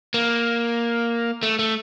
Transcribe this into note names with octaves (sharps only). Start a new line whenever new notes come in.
A#3
A3
A3